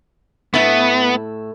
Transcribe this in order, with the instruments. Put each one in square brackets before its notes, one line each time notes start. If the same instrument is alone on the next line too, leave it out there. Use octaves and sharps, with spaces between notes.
[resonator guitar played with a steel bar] A2 E4 [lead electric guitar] B3